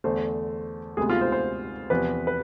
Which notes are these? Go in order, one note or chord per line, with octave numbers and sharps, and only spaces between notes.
E2 D3 A3 C5
D2 C3 G#3 B3 G#4
F4
C5
C5
E2 C3 F3 B4
B4